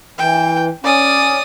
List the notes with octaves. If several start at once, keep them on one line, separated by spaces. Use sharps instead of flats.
E3 G5
C#4 D5 D#6